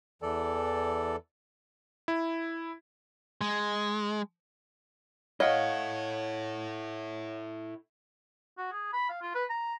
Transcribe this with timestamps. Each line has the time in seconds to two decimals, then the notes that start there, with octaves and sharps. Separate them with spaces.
0.22 E2 E3 A4 D5
2.08 E4
3.41 G#3
5.40 E4 A4 C#5 D#5 F5 F#5
8.58 F#4
8.72 G#4
8.93 B5
9.09 F5
9.22 F4
9.35 B4
9.50 A#5